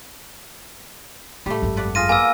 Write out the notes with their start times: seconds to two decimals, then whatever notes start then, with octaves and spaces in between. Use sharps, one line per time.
1.46 A2 G3 A3
1.62 G#1 F#2
1.77 B4 D5 F#5
1.95 F4 G#4 F6 A#6 D#7
2.09 A#3 B3 G#5 E6